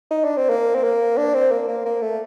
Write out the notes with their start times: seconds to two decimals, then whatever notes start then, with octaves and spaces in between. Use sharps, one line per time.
0.11 D#4
0.24 D4
0.37 C4
0.50 A#3
0.75 C4
0.84 A#3
1.17 D4
1.34 C4
1.51 A#3
1.68 A#3
1.85 A#3
2.02 A3